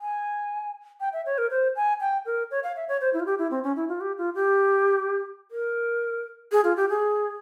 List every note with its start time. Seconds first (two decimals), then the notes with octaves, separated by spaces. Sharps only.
0.01 G#5
1.00 G5
1.13 E5
1.26 C#5
1.38 A#4
1.51 C5
1.76 G#5
2.01 G5
2.26 A#4
2.51 C#5
2.64 F5
2.76 E5
2.88 C#5
3.01 C5
3.14 E4
3.20 F4
3.26 G4
3.39 E4
3.51 C4
3.64 C#4
3.76 E4
3.89 F4
4.01 G4
4.18 F4
4.35 G4
5.51 A#4
6.52 G#4
6.64 F4
6.77 G4
6.89 G#4